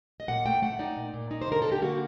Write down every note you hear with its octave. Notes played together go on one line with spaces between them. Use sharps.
D#5
A#2 F#5
A3 G5
A3 F#5
D#4 D5
A#2
A#2
D#4
C5
D3 A#4
D3 A4
G4
A#3 F#4